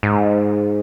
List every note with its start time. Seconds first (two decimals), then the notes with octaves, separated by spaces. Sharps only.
0.03 G#2